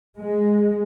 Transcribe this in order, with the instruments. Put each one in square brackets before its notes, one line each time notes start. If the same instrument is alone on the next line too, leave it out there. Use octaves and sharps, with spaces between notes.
[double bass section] G#3